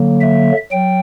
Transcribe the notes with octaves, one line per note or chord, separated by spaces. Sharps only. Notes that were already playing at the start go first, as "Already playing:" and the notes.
Already playing: D3 F#3 A#3
E5
F#3 G5